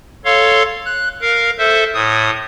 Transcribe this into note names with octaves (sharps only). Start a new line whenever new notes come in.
A4 C#5 F5 C6
F#6
A#4 F5
A4 C5 E5
A2 D#6